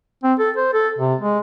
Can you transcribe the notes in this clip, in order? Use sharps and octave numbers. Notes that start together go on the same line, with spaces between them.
C4
A4
C5
A4
C3
G#3